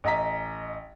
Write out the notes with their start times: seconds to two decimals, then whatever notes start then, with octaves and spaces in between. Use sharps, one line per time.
0.04 A1 D#5 A#5 B6